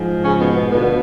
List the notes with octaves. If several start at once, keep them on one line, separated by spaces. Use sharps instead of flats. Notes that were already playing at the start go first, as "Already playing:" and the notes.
Already playing: G#2 F3
C#3 C#4
B2 B3
B2 B3
D2 B2 D3 F3 B3